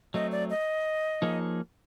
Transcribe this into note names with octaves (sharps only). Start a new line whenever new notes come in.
F#3 A3 C4 D#5
D5
D#5
F3 A#3 D#4 G#4 C#5